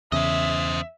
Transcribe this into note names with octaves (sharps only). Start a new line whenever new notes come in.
E2 C#3 C5 D#5 E5